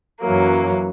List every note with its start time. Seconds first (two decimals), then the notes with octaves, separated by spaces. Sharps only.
0.21 F#2 E3 F#3 A#3